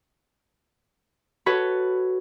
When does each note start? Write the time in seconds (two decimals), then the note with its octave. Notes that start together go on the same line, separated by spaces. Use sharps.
1.46 F#4 A4 B4 C#5